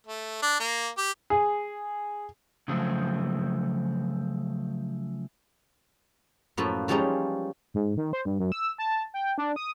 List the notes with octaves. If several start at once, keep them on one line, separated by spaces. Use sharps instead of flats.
A3
D4
A#3
G4
G#4
C#3 F3 F#3 A3 C4
F#2 A2 F3 A#3 B4
E3 F3 G3 G#3 C#4 D#4
G#2
D#3
C5
G2
F#2
E6
A5
G5
D4
D#6